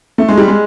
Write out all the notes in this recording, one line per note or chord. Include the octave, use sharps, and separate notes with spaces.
A3
G#3
G3
G#3